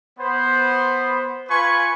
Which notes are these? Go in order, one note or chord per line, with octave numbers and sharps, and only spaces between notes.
B3 C5
F4 B4 G#5 C#6